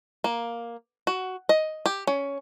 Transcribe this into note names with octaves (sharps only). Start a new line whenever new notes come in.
A#3
F#4
D#5
G4
C#4